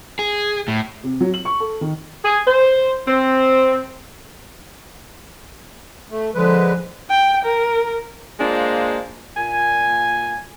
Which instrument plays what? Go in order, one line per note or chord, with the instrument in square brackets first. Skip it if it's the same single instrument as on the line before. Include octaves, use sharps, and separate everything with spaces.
[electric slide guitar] G#4
A2
[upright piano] C3
F#3
F#7
C#6
A4
D#3
[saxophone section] G#4
C5
C4
[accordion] A3
[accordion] D3 G#3 B4 [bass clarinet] F3
[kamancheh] G5
A#4
[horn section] G#3 A#3 D4 F4 C5
A#2 G#5